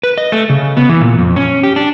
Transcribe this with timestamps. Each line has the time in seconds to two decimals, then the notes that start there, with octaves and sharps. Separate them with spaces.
0.03 B4
0.18 D#5
0.32 A3
0.50 C#3
0.77 B3
0.89 E3
1.01 A#2
1.19 F2
1.36 C#4
1.63 G4
1.76 D4